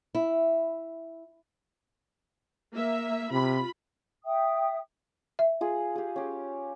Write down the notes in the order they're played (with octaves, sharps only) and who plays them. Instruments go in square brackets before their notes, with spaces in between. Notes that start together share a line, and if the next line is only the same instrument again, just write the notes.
[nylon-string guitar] E4
[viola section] A#3 E5
[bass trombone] C3 [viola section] F4 B5
[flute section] E5 G5 D#6
[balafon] E5
[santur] F4 G#4
G4 G#4
C#4 G4